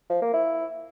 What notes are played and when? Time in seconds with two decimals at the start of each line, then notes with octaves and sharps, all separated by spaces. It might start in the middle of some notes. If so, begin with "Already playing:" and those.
0.10 F3
0.22 A#3
0.34 E4